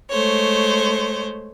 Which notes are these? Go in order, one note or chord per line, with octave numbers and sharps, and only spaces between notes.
G#3 A3 C5 C#5